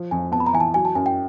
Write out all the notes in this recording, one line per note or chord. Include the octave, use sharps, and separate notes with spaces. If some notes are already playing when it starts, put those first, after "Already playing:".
Already playing: F3
F2 G#5
B3 A5
B5
A#5
E3 G#5
A5
F#3 G#5
A5
F#2 G#5
G5